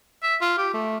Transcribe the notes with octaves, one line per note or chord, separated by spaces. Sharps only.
E5
F4
G4
A3